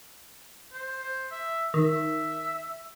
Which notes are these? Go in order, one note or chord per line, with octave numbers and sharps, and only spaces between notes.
C5
C5
E5
D#3 E5